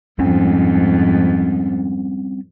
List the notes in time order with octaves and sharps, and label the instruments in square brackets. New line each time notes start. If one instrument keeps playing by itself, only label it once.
[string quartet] F2 G#2 [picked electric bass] G3 C4 C#4